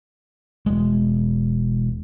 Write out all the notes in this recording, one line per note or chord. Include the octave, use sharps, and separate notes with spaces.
E1 G#3